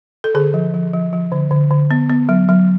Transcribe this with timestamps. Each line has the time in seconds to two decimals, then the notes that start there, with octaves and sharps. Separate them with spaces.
0.24 A4
0.35 D3 G#4
0.54 F3
0.74 F3
0.93 F3
1.13 F3
1.32 D3
1.51 D3
1.71 D3
1.91 B3
2.09 B3
2.29 F#3
2.49 F#3